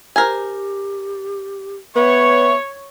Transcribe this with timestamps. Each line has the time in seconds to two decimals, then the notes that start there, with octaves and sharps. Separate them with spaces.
0.16 G4 A#4 C5 G#5
1.96 B3 C#5 E5